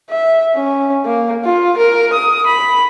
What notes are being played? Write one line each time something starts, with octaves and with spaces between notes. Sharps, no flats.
E5
C#4
A#3
F4
A#4
D#6
B5